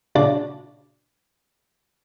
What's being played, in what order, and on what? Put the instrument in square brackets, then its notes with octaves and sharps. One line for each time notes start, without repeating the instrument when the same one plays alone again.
[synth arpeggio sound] A#2 C#3 D4 F#4 D5 D6